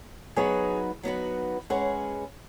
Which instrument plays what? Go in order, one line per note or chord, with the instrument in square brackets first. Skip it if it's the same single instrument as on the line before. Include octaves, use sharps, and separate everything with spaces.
[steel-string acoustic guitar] F#3 B3 D#4 F#4 B4 [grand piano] G#4 C#5
[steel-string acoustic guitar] F#3 B3 D#4 F#4 B4
[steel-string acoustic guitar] G#3 C#4 G#4 B4 [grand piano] C#5 F#5